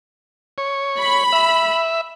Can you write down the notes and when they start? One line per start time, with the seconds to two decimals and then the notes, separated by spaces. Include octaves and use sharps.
0.58 C#5
1.00 B5
1.33 E5